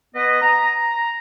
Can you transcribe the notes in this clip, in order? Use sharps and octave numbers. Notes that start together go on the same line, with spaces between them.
B3 B4 D#5
A#5